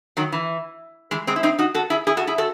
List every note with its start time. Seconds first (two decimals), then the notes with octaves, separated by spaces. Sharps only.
0.17 D#3 F#3
0.32 E3
1.11 E3 G#3
1.27 G#3 C4
1.36 E4
1.43 C4 D#4
1.59 D#4 F#4
1.74 F#4 A4
1.90 E4 G#4
2.07 E4 G#4
2.17 F#4 A4
2.27 E4 G#4
2.38 F#4 A4